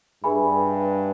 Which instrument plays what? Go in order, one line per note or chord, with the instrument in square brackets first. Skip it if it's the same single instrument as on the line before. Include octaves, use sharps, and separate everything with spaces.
[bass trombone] G2 [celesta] G#4 B4 E5 G#5 B5